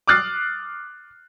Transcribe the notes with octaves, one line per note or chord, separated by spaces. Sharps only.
D6 D#6 F6 F#6 A6 C7